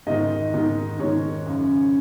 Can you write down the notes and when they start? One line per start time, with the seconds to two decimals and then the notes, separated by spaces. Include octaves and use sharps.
0.07 G#2 D#3 D#5
0.54 G#2 D#3
0.99 G#2 D#3 C#5
1.46 F#2 C#3